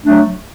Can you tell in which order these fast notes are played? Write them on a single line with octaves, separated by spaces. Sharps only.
A3 D4 F#3